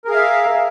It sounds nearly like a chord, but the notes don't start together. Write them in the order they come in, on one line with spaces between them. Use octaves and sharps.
A#4 G#4 F5 E5